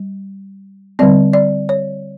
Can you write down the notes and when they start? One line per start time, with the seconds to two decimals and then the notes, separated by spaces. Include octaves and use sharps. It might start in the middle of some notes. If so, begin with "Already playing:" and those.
Already playing: G3
0.99 D3 G3 C4 D5
1.33 D5
1.69 C#5